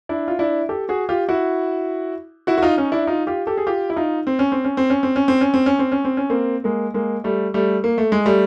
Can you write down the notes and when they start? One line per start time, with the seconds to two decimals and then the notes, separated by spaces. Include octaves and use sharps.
0.09 D4 E4
0.28 F4
0.39 D4 E4
0.69 G4 A4
0.89 F#4 G#4
1.09 F4 G4
1.29 E4 F#4
2.47 E4 F#4
2.58 F#4
2.62 D#4 F4
2.77 C#4 D#4
2.92 D4 E4
3.07 D#4 F4
3.27 F4 G4
3.47 G4 A4
3.58 G#4
3.67 F4 G4
3.90 E4
3.96 D#4 F4
4.27 C4
4.39 C#4
4.52 C4
4.64 C#4
4.77 C4
4.90 C#4
5.03 C4
5.16 C#4
5.28 C4
5.41 C#4
5.54 C4
5.66 C#4
5.79 C4
5.92 C#4
6.05 C4
6.17 C#4
6.30 A#3 C4
6.64 G#3 A#3
6.94 G#3 A#3
7.24 G3 A3
7.54 G3 A3
7.84 A#3
7.98 A3
8.12 G#3
8.26 G3 A3